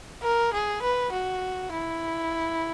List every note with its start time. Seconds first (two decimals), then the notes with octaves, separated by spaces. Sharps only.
0.22 A#4
0.53 G#4
0.82 B4
1.12 F#4
1.72 E4